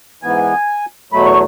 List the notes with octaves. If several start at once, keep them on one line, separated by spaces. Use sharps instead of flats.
G#2 E3 B3 G#5
E2 B2 F#3 A3 B5
C#6